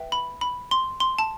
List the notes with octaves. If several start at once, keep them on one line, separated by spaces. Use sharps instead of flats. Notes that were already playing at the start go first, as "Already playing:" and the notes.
Already playing: B4 E5 G5
B5
B5
C6
C6
A5